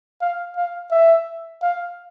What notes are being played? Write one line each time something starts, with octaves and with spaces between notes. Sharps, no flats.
F5
F5
E5
F5